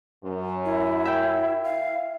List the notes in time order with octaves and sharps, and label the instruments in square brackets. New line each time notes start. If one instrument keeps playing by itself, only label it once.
[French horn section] F#2
[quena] E4
[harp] E5 G5
[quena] F5